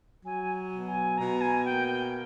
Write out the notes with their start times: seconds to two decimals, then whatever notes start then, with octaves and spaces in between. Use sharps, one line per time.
0.25 F#3 G#5
0.72 B2
0.88 G#5
1.18 B2 A#5
1.41 G#5
1.65 A#3 G5
1.88 G5